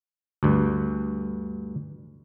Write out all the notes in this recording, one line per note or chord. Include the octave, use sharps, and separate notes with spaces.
D2 G2